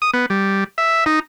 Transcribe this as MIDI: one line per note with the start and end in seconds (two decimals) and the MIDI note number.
0.02 0.11 87
0.14 0.26 59
0.30 0.64 55
0.78 1.04 76
1.06 1.19 63